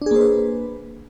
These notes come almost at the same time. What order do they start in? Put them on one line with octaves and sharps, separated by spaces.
D4 G#4 A#3 C5 B4